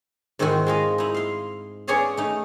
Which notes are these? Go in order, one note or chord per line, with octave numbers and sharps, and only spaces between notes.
G#2 D#3 C4 E4 F#4
G#3 F4 D#5
D#4 E4
F5 C6
B3 C#4 G#4 C#5 D5 F5
A3 D#4